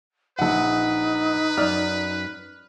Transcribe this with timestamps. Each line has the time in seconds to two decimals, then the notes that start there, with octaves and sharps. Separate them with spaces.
0.39 A#1 D#4 B4 F#5
1.57 F#2 D5 F6